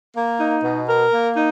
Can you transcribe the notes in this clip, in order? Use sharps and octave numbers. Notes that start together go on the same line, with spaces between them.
A#3
D#4
B2
A#4
A#3
D#4